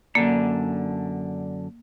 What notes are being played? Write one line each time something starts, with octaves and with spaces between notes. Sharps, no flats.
F#2 D3 A#3 D4